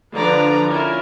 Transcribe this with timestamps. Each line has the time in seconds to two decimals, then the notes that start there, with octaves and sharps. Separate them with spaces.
0.13 D3 F3 B4 D5 A#5
0.69 C#4 E4 F4 A#4